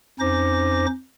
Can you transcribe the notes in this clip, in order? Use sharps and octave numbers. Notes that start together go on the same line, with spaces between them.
F2 C#4 D#4 C5 D6 A#6